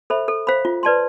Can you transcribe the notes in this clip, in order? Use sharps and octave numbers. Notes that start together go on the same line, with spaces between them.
A4 C5 E5 B5
A4
C5 F5 B5
F4
B4 D5 A5 C6